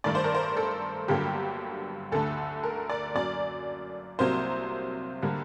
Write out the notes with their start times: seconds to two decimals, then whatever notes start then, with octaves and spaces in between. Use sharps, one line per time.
0.04 G2 D#3 A3 D5
0.15 C5
0.24 A#4
0.34 C5
0.57 A4
1.08 G1 G2 D3 F#3 A#3 G4
2.12 D2 D3 A3 A4
2.63 A#4
2.90 D5
3.15 F#2 F#3 A#3 D5
4.19 C2 C3 F#3 A#3 C5
5.23 D3 G3 A#3